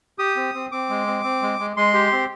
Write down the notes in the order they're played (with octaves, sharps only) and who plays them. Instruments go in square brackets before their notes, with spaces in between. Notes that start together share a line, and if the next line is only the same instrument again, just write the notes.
[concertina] G4 D#6
C4
C4
C4 D6
G#3
C4
C4
G#3
G#3
G#3 C6
G4
C4